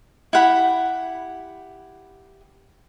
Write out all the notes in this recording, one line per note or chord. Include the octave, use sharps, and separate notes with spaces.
E4 G4 F#5 B5